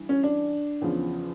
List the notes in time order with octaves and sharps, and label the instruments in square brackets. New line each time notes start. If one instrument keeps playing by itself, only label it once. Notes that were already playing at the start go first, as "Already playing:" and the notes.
Already playing: [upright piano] G2 E3
C#4
D4
E2 C#3 F3